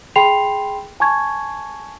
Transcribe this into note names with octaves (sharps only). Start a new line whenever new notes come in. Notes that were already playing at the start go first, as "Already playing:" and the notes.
G#4 G5 B5 C6 C7 F7
G#5 A5 C#6 G#6